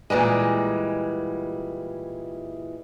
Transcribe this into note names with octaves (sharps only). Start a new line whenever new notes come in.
A#2 E3 G3 G#3